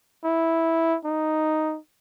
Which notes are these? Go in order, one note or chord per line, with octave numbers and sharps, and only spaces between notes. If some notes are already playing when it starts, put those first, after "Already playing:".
E4
D#4